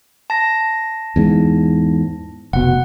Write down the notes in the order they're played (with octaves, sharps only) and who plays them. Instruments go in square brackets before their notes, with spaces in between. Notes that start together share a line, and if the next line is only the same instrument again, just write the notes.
[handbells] A5 A#6
[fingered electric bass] E2 G#2
[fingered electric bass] F1 B2 [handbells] F#5